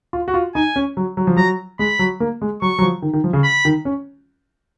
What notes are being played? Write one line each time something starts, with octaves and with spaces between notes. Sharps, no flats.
F4
F#4
F4
D#4 G#5
C#4
F#3
F#3
F3
F#3 A#5
G#3 B5
F#3
A#3
G#3
F#3 C#6
F#3
F3
D#3
D#3
F3
C#3
B5
D#3
C#4